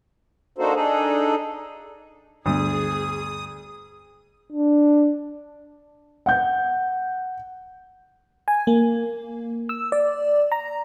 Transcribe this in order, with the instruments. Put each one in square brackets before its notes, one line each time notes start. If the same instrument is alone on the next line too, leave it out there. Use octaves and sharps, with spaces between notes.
[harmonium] A#3 D4 D#4 F#4 A4 C5
D4 D#4 G#4 A4
[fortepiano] D2 [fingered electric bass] G2 G3 B3 [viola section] G#4 [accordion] D#6
[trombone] D4
[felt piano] F#5 G6
[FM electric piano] G#5
A#3
E6
D5
A#5